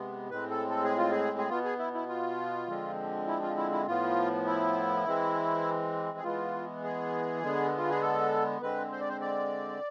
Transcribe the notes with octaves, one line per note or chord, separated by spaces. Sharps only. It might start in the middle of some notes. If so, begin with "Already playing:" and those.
Already playing: C3 G#3 B3
A2 G#3 C4 B4
A4
A4
G#4
F4
G#4
G#4
B2 B3 F4
G#4
E4
E4
F4
D3 F3 G#3 C4
E4
F4
E4
E4
A2 F3 B3 F4
E4
E3 G#3 C4
G#4
E3 G#3 B3 F4
G#4
D3 G#3 B3
F4
G#4
A4
D3 G#3 C4 B4
C5
D5
C5
D5